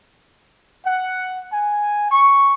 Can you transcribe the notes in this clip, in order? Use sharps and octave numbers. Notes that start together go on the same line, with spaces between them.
F#5
G#5
C#6